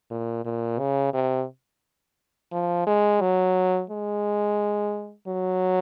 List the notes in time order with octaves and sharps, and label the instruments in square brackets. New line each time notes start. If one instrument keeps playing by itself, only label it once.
[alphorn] A#2
A#2
C#3
C3
F3
G#3
F#3
G#3
F#3